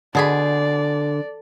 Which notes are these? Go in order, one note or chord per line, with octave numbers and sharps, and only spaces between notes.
B2 D3 G#4 D5 B5